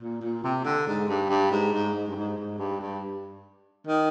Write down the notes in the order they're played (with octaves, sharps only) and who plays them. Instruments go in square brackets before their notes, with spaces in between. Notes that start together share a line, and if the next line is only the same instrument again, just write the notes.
[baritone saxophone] A#2
A#2
C3
D3
G#2
G2
G2
G#2
G#2
G#2
G2
G#2
G#2
G2
G2
D#3